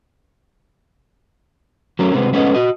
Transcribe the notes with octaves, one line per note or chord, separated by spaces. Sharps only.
F#3 A3 C#4 A#4
C3 G#3 B3 C4
G#3 A3 B3 C#4 B4 D#5
F#4 D#5